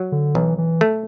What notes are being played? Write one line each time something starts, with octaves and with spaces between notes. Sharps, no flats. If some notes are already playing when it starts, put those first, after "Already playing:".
Already playing: F#3
D3
B1 E3
E3
A3